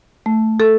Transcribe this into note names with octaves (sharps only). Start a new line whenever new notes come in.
A3
A4